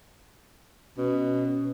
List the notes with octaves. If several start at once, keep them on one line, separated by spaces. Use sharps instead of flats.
B2 C#4